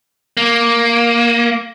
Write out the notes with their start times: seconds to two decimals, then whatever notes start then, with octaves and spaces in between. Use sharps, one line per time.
0.37 A#3